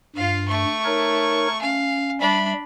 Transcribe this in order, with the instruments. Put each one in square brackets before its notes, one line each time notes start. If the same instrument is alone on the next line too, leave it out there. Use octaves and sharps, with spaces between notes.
[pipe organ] G2 [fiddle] F4 F5
[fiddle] A3 C#6
[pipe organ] D#4 A#4 C#5
[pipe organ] C#4 [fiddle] F5
[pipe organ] G3 E5 [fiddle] D4 B5